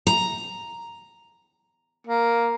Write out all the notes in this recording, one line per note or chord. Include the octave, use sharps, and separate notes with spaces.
A#5
A#3